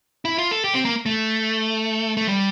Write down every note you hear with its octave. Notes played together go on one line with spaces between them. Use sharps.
E4
F4
A4
G4
C4
A#3
A3
A3
G3